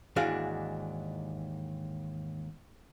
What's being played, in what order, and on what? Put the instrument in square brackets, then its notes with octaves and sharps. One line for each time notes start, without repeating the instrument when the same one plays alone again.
[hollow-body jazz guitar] D#2 G#2 E3 D4 F#4 F5